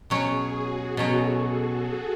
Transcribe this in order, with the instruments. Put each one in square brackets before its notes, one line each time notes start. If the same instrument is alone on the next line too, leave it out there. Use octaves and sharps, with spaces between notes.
[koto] B2 F#3 C#4 [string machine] G#4
[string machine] F#4
[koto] B2 F#3 C#4 [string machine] A4